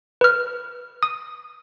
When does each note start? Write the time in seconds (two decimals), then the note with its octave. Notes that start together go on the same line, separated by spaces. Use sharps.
0.21 B4 F6
1.03 D#6